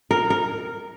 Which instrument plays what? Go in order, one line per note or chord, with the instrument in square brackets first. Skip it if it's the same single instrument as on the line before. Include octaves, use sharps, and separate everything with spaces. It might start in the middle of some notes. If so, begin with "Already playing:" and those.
[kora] A#4
A#4